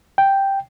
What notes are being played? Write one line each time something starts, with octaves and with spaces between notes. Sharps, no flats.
G5